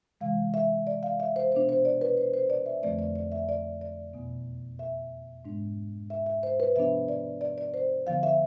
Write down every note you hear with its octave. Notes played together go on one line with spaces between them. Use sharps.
C3 E3 G#3 F5
E5
D5
F5
E5
C5
B2 B3 D4 C5
C5
D5
B4
C5
C5
D5
E5
F2 D3 F3 A3 C4 D5
D5
D5
E5
D5
D5
E2 B2 B3
E5
G#2 G#3 B3 D4
E5
E5
C5
B4
C3 F3 B3 D4 E5
D5
D5
D5
C5
E2 D3 F3 B3 F5
E5